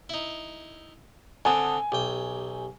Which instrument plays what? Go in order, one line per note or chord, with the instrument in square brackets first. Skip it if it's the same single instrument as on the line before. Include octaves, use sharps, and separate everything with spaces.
[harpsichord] D#4 E4
[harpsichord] D3 C4 [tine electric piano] F#5 A5 D#6 [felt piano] G#5
[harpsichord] B1 G5 [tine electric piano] G4